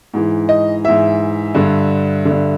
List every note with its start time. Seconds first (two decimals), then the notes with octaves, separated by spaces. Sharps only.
0.14 G#2 E3
0.49 D#5
0.84 G#2 E3 E5
1.55 G2 D3
2.25 G2 D3